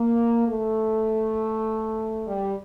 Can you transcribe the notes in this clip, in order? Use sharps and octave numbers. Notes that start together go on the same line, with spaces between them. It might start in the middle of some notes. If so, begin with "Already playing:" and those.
Already playing: A#3
A3
G3